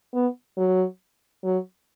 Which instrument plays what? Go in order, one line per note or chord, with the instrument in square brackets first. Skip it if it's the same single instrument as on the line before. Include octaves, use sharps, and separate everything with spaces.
[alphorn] B3
F#3
F#3